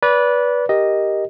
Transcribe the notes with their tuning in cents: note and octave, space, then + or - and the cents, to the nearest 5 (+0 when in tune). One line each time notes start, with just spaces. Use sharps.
B4 -15 D5 -25
G4 +0 A#4 +5 D#5 +0